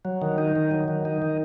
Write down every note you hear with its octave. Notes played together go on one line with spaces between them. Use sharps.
F#3
D#3
D#4
D#3
F#3
D#3
D#4
D#3